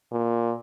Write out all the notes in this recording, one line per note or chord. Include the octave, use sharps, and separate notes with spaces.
A#2